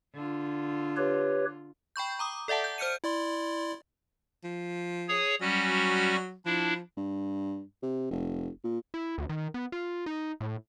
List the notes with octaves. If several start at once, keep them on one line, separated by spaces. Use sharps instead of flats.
D3 F4
G4 B4 C#5
G5 B5 C#6 G6
A#5 D6 D#6
A4 D5 E5 F#5 A5
G6
C5 F6 G6 C#7 D#7
E4 D5 C6
F3
G#4 C#5 D#6
F#3 G3 C#4 F#4
F3 D4 E4
G2
C3
F1
A#2
E4
D2
D#3
B3
F4
D#4
A2